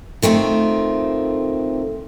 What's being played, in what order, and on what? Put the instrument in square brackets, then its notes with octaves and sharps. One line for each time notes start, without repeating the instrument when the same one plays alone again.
[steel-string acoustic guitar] D#3 A3 C4 F4